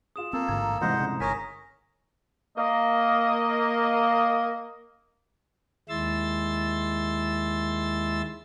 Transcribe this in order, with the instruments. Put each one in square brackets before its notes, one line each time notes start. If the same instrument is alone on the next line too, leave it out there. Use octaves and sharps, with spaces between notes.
[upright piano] F4 G#4 [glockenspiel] D#6 E7
[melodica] A#3 A4 [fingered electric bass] C4
[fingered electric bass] A1 G#2 D3 [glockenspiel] A#5 G#6
[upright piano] C2 F2 G#2 [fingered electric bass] E3 G#3 [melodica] C5 D#5 F#5
[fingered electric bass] C#3
[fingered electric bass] G1 [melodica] A#4 C#5 G#5 [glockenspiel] D#6 A#6 B6
[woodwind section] A#3 D#5
[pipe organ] D#2 G#3 E4 C6 E6 A6